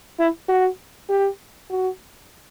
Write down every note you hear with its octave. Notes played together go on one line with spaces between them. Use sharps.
E4
F#4
G4
F#4